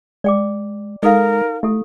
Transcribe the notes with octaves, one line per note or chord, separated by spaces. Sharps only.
G#3 D5 G5 D6
G#3 D#4 A4 A#4 F5
A3 E4 G4 A4